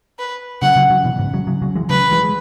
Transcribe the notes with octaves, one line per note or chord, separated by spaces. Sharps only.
B4
C#3 F#3 F#5
C#3 F#3
C#3 F#3
B2 E3
G#2 C#3
C#3 F#3
C#3 F#3
C#3 F#3
E3 G#3
C#3 F#3 B4
E3 G#3
G#3